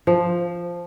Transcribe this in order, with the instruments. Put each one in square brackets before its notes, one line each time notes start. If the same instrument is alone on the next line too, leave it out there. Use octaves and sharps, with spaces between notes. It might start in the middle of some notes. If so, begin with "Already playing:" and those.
[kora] F3